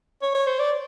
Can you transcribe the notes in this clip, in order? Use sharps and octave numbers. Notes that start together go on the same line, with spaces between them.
C#5
C#5
C5
D5